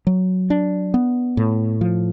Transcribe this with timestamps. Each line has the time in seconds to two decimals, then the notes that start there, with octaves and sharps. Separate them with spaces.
0.07 F#3
0.50 D4
0.94 B3
1.37 A2
1.81 F3